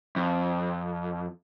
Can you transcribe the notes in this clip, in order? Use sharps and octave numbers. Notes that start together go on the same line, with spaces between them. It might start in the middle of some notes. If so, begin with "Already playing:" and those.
F2